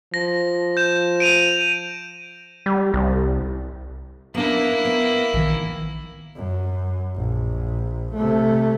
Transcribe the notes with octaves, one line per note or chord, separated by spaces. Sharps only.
F3 A#6
G6 E7
D7 D#7 F7
G3
C2
A#3 B3 D4 E4
B3
A#1 D#3 E3
F#2
A#1
C3 A3